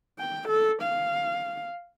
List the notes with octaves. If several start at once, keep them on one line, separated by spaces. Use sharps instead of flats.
G5
A4
F5